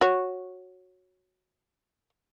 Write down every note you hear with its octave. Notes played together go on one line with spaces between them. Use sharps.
F#4 C#5